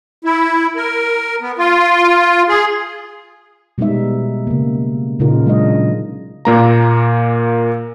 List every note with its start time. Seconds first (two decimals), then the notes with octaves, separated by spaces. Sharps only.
0.24 E4
0.76 A#4
1.41 B3
1.58 F4
2.49 G#4
3.78 B2 G3 G#3 B3 D#4 E5
4.47 C#3 A#3
5.19 A#2 C#3 D#4 F4 A#4
5.46 F#3 G#3 C#4 D4 D#5
6.45 A#2 A#3 A#5